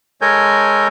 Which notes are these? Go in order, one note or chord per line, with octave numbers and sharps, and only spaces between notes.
G#3 A4 A#4 C#5 G#5 G6